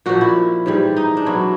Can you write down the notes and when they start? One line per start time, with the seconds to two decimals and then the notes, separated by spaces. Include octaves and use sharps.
0.06 A#2 F3 F#4
0.21 E4
0.66 G#2 E3 G3
0.97 D#4
1.17 D4
1.26 B2 F#3 E4